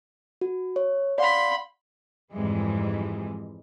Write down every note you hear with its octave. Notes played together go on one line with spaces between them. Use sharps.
F#4
C#5
D5 F5 F#5 B5 C6
F2 G#2 E3 G3 G#3